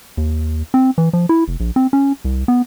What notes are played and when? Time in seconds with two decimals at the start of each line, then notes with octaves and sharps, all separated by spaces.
0.17 D#2
0.74 C4
0.98 E3
1.13 F3
1.29 E4
1.48 F1
1.60 A#1
1.76 C4
1.93 C#4
2.24 C2
2.48 B3